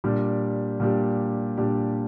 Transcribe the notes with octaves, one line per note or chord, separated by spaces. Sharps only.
A#2 G3 D4 G4
A#2 G3 D4 G4
A#2 G3 D4 G4